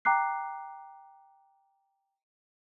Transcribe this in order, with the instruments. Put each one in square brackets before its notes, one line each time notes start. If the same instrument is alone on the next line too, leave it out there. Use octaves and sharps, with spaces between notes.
[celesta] G5 A#5 D6 F#6 C7